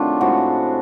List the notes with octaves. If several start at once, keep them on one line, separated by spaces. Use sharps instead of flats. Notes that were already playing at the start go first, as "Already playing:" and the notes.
Already playing: C3 D#3 F#3 A3 D4 F4
A2 F3 G#3 F#4